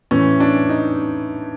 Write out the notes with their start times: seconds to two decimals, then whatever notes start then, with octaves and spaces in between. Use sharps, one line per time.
0.11 A2 E3 C#4
0.40 D4
0.69 D#4